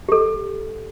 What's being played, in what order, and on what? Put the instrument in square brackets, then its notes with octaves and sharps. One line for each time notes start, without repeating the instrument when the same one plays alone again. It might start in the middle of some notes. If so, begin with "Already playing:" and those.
[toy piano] G4 A4